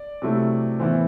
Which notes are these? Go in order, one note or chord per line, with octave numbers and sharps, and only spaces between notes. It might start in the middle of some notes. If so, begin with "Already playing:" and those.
Already playing: D5
C3 F#3 A3 E4
A2 E3 B3 E4 C5